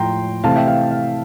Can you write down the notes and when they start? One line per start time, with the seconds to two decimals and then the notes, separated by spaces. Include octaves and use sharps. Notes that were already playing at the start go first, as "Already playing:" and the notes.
Already playing: A2 F3 A3 G5 A#5 C6
0.43 C3 E3 A3 C4 F5 A5
0.55 E5 G5
0.68 F5
0.91 F5